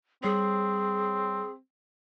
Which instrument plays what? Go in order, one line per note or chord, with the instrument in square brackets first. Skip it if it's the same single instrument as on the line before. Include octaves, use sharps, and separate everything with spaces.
[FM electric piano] G3 C#5 [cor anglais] C4 [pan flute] G#4